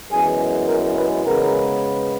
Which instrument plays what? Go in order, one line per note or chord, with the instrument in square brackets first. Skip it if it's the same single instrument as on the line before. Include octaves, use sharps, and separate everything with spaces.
[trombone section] F#2 E3 G#3 B3 G#4
A#4
B4
C#3 G#3 B3 A#4